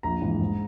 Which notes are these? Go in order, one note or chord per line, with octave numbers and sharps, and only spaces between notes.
A#1 A#5
G#2 E3
G#2